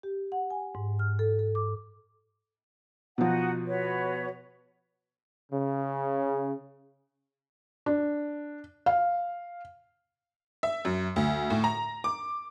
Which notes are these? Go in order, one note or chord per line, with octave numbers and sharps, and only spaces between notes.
G4
F#5
G#5
G#2
F6
A4
A4
D6
B2 F3 D#4 F#4 F#5
F#4 B4 C#5
C#3
D4
F5
E5
F#2
D2
A2
A#5
D6